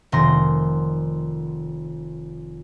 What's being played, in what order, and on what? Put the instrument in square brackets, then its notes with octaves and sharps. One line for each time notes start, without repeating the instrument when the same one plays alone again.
[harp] F1 D#3 C6 A#6